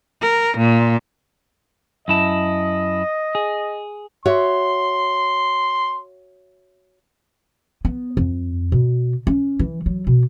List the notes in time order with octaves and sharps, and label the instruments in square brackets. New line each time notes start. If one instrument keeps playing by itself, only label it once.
[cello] A#4
A#2
[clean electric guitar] F#2 E4 A5 [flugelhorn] D#5
[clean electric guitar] G#4
[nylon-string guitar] F#4 C#5 E5 [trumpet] C6
[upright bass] B3
F2
B2
C#4
E3
F#3
B2